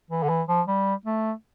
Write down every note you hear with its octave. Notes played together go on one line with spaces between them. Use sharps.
E3
D3
E3
F3
G3
A3